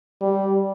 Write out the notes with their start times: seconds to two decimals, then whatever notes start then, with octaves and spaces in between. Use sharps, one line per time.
0.21 G3